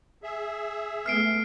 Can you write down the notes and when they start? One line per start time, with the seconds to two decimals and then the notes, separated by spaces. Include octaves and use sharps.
0.23 G#4 E5
1.06 A3 B3 F6 C7 D7